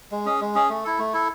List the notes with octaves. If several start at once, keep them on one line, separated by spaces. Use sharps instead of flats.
G#3
C#4 G#4
G#3
C#4 G#4
A3
E4 A4
A3
E4 A4